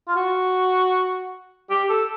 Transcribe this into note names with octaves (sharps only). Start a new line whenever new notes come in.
F4
F#4
G4
A4